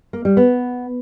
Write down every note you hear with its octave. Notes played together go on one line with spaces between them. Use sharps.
A#3
G3
B3